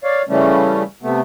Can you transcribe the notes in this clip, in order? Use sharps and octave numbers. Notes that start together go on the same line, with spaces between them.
C#5 D5 F5
C#3 E3 G3 A3 C#4
C3 A3 B3